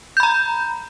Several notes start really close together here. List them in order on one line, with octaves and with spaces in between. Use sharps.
G6 B5 A#5